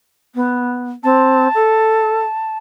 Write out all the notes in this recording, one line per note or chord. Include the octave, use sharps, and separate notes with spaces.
B3
C4 A5
A4